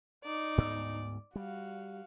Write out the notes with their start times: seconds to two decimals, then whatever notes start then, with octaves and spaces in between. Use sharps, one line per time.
0.24 D#4 D5
0.58 D2 G#2 B3
1.36 G3 F#4 F5